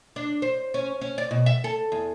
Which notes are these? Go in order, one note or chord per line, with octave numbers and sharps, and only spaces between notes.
D4
C5
C#4
C#4
D5
B2
E5
A4
E2